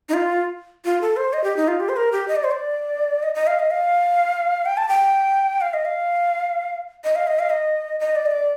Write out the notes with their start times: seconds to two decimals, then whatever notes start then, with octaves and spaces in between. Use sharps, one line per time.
0.09 D#4
0.14 F4
0.85 F4
1.01 A4
1.17 C5
1.33 D#5
1.44 G4
1.57 D#4
1.68 F4
1.80 G4
1.89 C5
1.96 A#4
2.12 G4
2.28 D#5
2.36 D5
2.44 C5
2.51 D5
3.23 D#5
3.35 D#5
3.47 F5
3.59 D#5
3.71 F5
4.66 G5
4.77 A5
4.89 G5
5.61 F5
5.74 D#5
5.85 F5
7.04 D#5
7.15 F5
7.27 D#5
7.39 F5
7.50 D#5
8.00 D#5
8.16 D5
8.26 D#5
8.31 D5